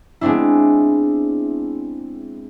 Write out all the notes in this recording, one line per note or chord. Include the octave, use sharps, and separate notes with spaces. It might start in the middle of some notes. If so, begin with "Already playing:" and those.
G#3 B3 C4 D4 E4